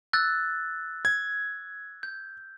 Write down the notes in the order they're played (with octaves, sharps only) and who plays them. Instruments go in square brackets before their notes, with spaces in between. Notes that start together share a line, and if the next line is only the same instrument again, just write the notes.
[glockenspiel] E6 F#6 A6
[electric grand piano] G#6
[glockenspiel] G6